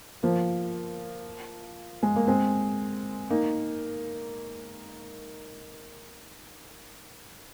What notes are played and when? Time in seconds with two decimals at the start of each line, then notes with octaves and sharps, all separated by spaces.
0.23 F3 A#3
2.03 G#3
2.16 A#3
2.27 G#3 C4
3.30 A#3 D#4